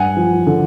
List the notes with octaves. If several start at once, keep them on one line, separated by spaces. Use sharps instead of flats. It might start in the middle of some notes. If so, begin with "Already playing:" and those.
Already playing: G2 F#5 G#5
F3
D3